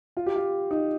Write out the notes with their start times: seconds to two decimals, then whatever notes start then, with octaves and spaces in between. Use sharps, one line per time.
0.17 F4
0.26 G4
0.36 F4
0.71 D#4